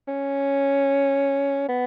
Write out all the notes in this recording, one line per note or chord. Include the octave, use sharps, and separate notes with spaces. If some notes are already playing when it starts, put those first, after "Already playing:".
C#4
B3